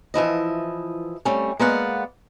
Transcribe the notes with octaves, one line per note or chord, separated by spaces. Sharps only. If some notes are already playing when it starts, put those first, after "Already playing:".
E3 F3 E4 D#5
G3 A3 C4 C#4
G#3 A#3 B3 D5 F5 F#5